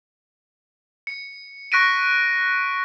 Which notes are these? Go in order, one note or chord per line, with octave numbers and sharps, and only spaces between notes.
C#7
C#6 F#6 A#6 B6 D7 D#7